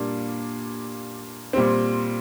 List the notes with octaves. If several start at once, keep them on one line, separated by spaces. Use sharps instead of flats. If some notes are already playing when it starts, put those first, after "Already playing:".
Already playing: A#2 G3 A#3 D4
A#2 G3 C4